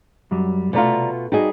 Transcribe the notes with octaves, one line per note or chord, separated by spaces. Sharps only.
F#2 F#3 G3
C2 B2 A3 F4 D5 A#5
G3 D#4 F#4 G#4 D#5